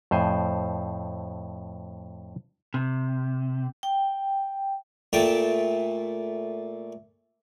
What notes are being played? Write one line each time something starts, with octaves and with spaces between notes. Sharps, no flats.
F2 A2 C5 G#5
C3
G5
A#2 A3 G5 A5